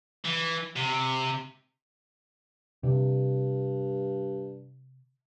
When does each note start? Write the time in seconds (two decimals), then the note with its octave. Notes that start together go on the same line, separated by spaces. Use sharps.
0.25 E3
0.76 C3
2.83 G2 C3